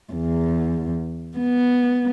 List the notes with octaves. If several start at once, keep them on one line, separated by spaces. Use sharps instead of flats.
E2
B3